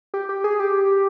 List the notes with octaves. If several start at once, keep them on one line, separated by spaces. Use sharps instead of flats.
G4
G4
G#4
G4